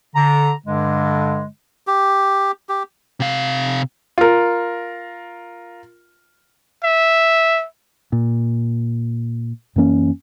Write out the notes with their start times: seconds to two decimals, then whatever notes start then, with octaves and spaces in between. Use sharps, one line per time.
0.15 D3 A#5
0.66 G2 D3 G#3
1.87 G4
2.69 G4
3.20 C3 F5
4.18 F4 A#4
6.83 E5
8.12 A#2
9.76 F#2 E3 A#3 C#4